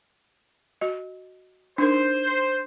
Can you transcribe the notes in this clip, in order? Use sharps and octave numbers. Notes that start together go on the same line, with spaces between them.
F#4 D#5
D4 D#4 A#4 C5